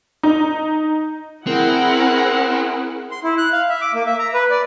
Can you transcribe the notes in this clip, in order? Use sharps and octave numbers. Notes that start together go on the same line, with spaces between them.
D#4
C4 E4 G#4 A#4 F#5
C6
E4
F#6
F5
E5
D6
A#3
E5
A#5
B4
D5